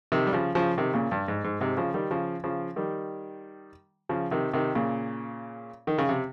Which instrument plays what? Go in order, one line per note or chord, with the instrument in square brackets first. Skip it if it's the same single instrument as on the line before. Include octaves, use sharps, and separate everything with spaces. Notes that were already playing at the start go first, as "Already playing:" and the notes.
[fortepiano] C3 D#3
G3
C#3 F3
C#3 F3
C3 D#3
A#2 C#3
G2
G#2
G#2
G#2 C3
C#3 F3
D#3 G3
C#3 F3
C#3 F3
D#3 G3
C#3 F3
C3 D#3
C3 D#3
A#2 C#3
D#3
C#3
C3